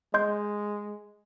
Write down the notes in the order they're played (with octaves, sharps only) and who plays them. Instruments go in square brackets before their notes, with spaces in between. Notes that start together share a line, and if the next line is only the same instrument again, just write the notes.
[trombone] G#3 [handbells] D#5 C6 G6